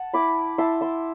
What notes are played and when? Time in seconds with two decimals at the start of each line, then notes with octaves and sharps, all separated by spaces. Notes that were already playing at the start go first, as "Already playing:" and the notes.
Already playing: F#5 A5
0.14 E4 B5 D6
0.58 E4 A5 C6
0.81 C6 E6